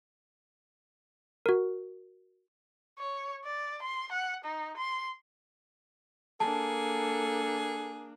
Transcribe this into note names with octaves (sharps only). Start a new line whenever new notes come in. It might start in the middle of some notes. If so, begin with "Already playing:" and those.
F#4 A#4
C#5
D5
C6
F#5
D#4
C6
A#3 D4 G#4 A4 A5